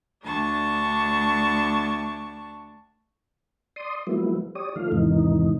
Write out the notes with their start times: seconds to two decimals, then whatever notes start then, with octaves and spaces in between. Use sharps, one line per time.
0.24 D2 D4 A5 C#6
3.76 D5 C6 D#6
4.07 F3 F#3 G#3 A#3 B3 E4
4.55 G4 C#5 D5 D#6
4.76 D#3 F3 A3 F5
4.92 E2 G#2 C3 D#3 E3 D#4